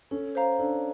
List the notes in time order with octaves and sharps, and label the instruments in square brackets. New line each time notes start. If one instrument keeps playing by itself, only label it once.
[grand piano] C#4 [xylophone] A4
[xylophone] C5 F5 A#5
[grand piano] D4 [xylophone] A4